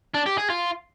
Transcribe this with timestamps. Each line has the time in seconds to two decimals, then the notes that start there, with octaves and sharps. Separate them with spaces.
0.14 D4
0.26 G4
0.38 G#4
0.50 F4